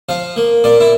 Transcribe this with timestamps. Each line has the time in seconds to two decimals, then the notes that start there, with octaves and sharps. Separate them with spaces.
0.09 F3 F5
0.36 A#3
0.64 A#2 D5
0.80 E4